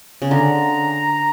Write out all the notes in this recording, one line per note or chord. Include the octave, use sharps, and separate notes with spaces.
C#3
D3 A#5